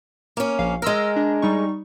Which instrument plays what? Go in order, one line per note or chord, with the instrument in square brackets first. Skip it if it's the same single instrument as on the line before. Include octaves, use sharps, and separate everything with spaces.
[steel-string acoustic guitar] A#3 C#4
[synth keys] A#1 F5
[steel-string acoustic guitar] G#3 A#4 [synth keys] C6 E6 F6
[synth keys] D4
G3 D#4 C#6